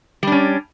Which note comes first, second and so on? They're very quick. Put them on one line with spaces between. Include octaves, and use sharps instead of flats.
G3 D4 C#4